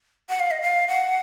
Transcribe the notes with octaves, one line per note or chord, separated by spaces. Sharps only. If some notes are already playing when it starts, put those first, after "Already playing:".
F#5
F5
D#5
F5
F#5